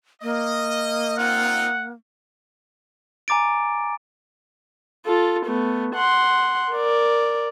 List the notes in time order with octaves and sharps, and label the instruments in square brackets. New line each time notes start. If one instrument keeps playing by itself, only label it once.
[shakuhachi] A#3 [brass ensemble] D#5
[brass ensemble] C4 D#4 F4 [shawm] F#5
[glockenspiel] G#5 A#5 D6 A6 D7
[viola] F4 A4
A3 B3
F#5 C6
A#4 D5